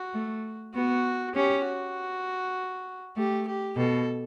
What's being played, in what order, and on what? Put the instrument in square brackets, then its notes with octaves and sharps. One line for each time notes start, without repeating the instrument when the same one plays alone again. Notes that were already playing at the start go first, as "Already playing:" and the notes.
Already playing: [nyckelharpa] F#4
[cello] A3
[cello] B3 [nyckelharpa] F#4
[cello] C#4 [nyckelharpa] G4
[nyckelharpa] F#4
[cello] A3 [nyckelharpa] G4
[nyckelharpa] G4
[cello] B2 [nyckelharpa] A4